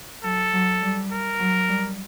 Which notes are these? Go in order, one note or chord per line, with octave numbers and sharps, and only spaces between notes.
F#3 A4
F#3
G3
A#4
F#3
G3